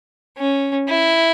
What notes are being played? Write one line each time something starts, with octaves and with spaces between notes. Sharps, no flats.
C#4
E4